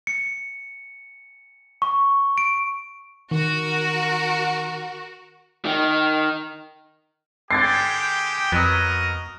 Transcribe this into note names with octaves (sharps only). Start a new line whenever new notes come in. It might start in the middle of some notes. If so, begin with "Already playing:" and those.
C#7
C#6
D7
D#3 F#4 A#4
D#3
D3 G#3 G4 G5 G#6 A6 C7
F2 F#3 B3 F#4 A#4 D#5